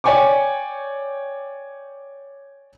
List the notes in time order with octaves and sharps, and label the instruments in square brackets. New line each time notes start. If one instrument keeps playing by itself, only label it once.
[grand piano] C#5 D5 G5 G#5 C#6 D6